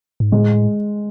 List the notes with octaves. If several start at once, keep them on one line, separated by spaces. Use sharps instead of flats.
G#2
A2 G#3